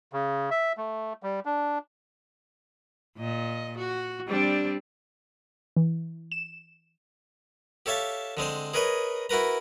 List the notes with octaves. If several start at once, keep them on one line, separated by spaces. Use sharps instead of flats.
C#3
E5
A3
G3
D4
A#2 D#5
F#4
G3 C4 D4
E3
E7
G4 A4 C#5 E5 F5 A5
D3 G#3 C4 C5
G#4 A#4 B4 C#5 D#5
E4 F#4 A#4 B4 A#5